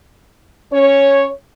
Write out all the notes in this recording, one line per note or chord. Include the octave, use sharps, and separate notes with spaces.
C#4 C#5